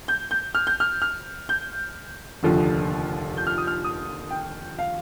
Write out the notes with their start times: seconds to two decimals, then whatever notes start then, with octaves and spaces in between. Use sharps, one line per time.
0.08 G6
0.31 G6
0.55 F6
0.67 G6
0.80 F6
1.02 F6
1.49 G6
2.43 F1 D#2 D3 F3
3.37 G6
3.47 F6
3.58 D#6
3.67 F6
3.84 D#6
4.31 G5
4.79 F5